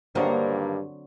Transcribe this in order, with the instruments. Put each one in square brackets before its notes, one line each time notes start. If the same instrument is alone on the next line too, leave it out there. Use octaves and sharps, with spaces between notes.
[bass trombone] G2 [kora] D3 F#3 C4 [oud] D#3 A#3 C5